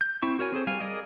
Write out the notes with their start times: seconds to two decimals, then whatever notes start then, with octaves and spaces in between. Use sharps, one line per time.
0.01 G6
0.22 C4 E4 C#6
0.39 F#4 A#4 C#5 G#5
0.52 C4 G#4 A4 C5
0.67 G3 F5 G#5
0.80 G#4 A#4 D5 D#5